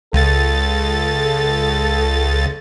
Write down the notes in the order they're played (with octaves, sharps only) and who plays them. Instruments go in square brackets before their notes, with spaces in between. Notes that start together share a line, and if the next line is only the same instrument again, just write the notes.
[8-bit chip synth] C#2 A6 [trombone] A4